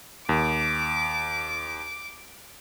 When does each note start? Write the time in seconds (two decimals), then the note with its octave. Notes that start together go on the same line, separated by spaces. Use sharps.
0.29 D#2 D6